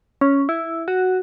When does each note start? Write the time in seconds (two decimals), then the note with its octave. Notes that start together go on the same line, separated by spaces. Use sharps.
0.21 C#4
0.49 E4
0.88 F#4